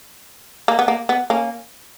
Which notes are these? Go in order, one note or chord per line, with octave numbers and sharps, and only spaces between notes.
A#3
B3
A#3
B3
A#3 C#4